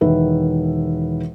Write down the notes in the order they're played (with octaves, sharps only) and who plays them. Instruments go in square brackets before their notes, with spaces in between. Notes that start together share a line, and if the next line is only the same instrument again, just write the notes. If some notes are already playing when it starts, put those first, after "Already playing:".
[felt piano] E1 D#3 B4 E5